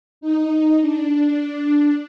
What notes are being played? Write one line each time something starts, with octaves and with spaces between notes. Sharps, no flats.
D#4
D4